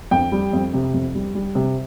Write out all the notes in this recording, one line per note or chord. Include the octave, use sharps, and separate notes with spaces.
F2 G5
G3
F2
C3
F2
G3
G3
C3